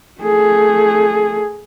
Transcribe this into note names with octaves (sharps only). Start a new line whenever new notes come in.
A3 G#4